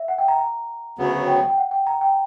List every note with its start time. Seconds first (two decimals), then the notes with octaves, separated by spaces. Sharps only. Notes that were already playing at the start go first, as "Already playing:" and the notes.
Already playing: E5
0.08 F#5
0.18 G5
0.28 A#5
0.38 A#5
0.98 D2 C#3 F#3 B3
1.27 G5
1.49 G5
1.58 F#5
1.71 G5
1.87 A#5
2.01 G5